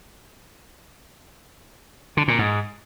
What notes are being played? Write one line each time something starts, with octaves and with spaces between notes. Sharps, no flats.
D3
A#2
G#2